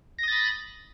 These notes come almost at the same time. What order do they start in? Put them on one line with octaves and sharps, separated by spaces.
A#6 D#6 A6 B5